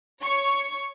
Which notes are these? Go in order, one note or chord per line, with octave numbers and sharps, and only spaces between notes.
C#5 C#6